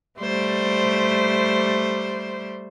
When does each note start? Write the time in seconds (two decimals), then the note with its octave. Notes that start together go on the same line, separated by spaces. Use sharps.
0.20 G3 A3 C5